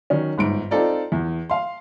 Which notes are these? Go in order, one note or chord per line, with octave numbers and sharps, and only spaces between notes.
D#3 F#3 C#4
G1 G#2 D7
C4 D#4 F4 A4 D5 A#5
E2
F5 C6